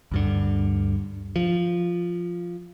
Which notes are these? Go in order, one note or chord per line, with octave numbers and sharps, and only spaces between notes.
D2 G2 D3
F3